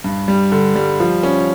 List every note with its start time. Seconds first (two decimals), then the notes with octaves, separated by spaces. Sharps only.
0.04 G2
0.28 G3
0.52 D3
0.76 G3
1.00 F3
1.23 C#4